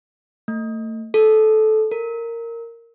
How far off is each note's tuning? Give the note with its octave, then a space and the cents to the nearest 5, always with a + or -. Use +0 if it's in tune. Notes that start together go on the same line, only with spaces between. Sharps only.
A3 +30
A4 -15
A#4 -10